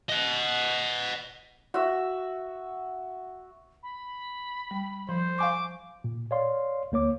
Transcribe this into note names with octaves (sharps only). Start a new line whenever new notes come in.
D#5 F#5
F#4 E5
B5
G3
F3 C5
F5 G#5 C#6 D6
A#2
C#5 D5 F5 C6
D2 A#3 C#5 D6